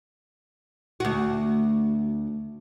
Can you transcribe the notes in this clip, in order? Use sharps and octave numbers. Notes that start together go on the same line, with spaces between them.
D2 F#4